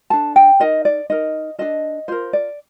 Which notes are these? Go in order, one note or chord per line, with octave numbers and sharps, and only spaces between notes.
D4 A4 A5
G5
D#4 A#4 D#5
D5
D#4 A#4 D#5
D4 F4 A4 D#5
F4 A#4 C5
D5